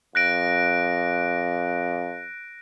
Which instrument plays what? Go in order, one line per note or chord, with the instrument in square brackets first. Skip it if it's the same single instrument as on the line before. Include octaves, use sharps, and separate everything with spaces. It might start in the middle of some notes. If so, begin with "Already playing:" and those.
[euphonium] F2 [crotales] F#6 A#6 D7